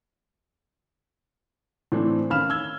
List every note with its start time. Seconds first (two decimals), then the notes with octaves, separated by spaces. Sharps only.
1.92 A2 E3 C4 D4
2.30 D#3 C#4 F5 B5 F6 E7
2.50 E6 G#6 G7